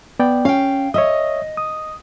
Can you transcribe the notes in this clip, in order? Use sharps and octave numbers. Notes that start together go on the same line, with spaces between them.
B3 D5 G5
C#4 F5 G5
C#5 D#5 E5 D#6
D#6